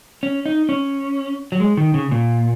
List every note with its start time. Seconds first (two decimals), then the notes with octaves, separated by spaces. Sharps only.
0.23 C#4
0.46 D#4
0.69 C#4
1.52 F#3
1.60 G#3
1.77 D#3
1.94 C#3
2.11 A#2